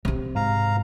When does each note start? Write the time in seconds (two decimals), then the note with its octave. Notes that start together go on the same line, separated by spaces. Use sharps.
0.05 C3 C4
0.36 G#2 F5 A#5